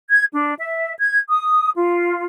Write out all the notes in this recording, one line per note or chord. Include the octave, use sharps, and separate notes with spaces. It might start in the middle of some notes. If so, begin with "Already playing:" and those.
G#6
D4
E5
G#6
D#6
F4